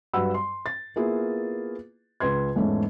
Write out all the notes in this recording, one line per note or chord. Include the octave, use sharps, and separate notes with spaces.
G2 F#3 B4 F#5 B5 E6
C6
A6
A#3 B3 E4 F4 G#4 B4
C#2 B4 C6 G#6
E2 G#2 G#3 A3 C#4